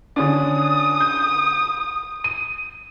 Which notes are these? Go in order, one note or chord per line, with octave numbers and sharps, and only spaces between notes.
D3 C#4 D4 D#6
G6
D#7